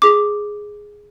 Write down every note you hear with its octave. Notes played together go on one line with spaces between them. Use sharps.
G#4 D6